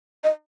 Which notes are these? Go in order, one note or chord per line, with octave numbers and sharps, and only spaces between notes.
D#5